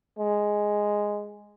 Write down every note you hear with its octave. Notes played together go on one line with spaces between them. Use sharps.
G#3